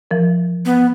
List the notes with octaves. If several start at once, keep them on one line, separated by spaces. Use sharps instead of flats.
E3 F3 A#4
B3